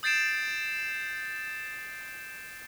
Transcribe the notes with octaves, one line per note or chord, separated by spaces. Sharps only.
D#6 G6 A6 C7 D7 E7